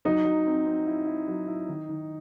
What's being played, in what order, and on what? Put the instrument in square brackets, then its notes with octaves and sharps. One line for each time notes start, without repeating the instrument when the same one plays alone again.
[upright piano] F#3 [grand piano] D#4
[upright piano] F#3
C4
C4
E4
E4
F#3
E4
D#3
D#3